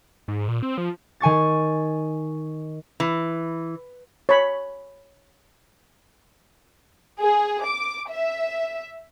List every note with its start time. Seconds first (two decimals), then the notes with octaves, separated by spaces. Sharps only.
0.28 G#2
0.48 A#2
0.63 C4
0.78 F3
1.20 D#3 G#5 C#6 A6
3.00 E3
4.29 C#5 B5
7.20 G#4
7.65 D6
8.10 E5